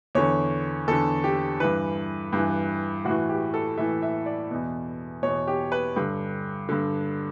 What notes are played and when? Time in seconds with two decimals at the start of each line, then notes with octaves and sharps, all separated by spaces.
0.15 E2 D3 C#5
0.88 E2 D3 A4
1.24 G4
1.60 G2 E3 B4
2.33 G2 E3
3.05 A2 F#4
3.10 E3
3.29 G4
3.54 A4
3.78 A2 E3 E5
4.02 E5
4.26 D5
4.51 E2 B2
5.23 B2 C#5
5.27 E2
5.47 G4
5.72 B4
5.96 G2 D3
6.69 G2 D3